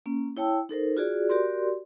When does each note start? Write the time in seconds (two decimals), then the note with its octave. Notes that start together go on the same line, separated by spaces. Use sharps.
0.06 A#3 C#4
0.37 E4 C#5 G5 A5 E6
0.69 D#4 A4 A#4 C5
0.97 F4 F#4 G#4 D5
1.29 F#4 G4 A#4 D5 C6